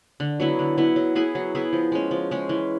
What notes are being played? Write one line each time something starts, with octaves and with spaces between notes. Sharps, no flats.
D3
F#3 B3 E4
D3
F#3 B3 E4
F#3
B3 E4 G#4
F#3
B3 E4 G#4
F3
G#3 C#4
F3
G#3 C#4
E3